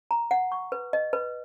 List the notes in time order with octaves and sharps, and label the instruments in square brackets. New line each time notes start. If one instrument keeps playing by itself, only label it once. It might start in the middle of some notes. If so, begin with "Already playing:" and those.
[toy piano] A#5
F#5
C#6
B4
D#5
B4